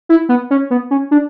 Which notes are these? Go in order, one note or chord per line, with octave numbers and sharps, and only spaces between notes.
E4
B3
C#4
B3
C#4
D4